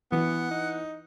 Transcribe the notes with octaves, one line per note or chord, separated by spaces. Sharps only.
E3 B3 F#5
D#4